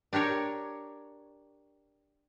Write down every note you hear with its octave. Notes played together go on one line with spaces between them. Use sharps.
D4 G4 A#4 C#5